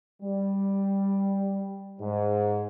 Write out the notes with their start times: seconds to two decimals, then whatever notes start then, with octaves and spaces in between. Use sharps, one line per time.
0.22 G3
2.00 G#2